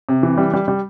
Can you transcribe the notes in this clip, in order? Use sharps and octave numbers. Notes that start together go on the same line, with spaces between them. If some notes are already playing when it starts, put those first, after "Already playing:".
C3
E3
G3
G3
G3